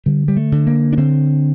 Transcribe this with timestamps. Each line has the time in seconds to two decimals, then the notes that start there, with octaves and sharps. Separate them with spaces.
0.06 D3 G3
0.28 G3
0.37 A3
0.52 D3
0.67 A#3
0.93 D4
0.97 D3 C4